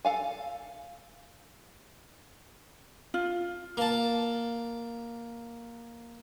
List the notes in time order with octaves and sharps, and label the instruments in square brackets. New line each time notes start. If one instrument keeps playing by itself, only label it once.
[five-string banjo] A4 F5 G#5
[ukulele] F4
[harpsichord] A#3 A5